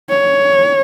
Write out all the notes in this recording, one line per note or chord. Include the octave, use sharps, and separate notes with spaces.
C#5